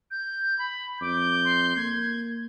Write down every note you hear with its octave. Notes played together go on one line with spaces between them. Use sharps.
G6
B5
F2 D6 G6
C6
A#3 G#6